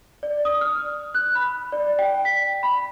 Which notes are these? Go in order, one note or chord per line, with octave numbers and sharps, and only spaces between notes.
D5
D#6
F6
F#6
B5
D5
G5
B6
B5